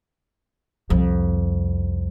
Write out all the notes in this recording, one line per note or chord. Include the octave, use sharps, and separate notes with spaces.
C2 F2